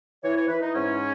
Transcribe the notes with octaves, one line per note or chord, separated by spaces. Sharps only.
E3 C#5
C#5
E3 B4
D#4
G#2 C#4